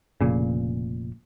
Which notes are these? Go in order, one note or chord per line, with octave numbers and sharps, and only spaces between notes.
F1 A#2 C#3